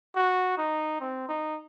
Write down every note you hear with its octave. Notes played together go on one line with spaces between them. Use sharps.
F#4
D#4
C4
D#4